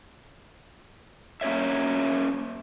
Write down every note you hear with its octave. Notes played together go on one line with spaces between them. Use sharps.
A#3 C#4 C5 C#5 E5